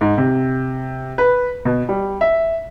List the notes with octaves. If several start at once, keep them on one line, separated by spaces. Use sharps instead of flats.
G#2
C3
B4
B2
G3
E5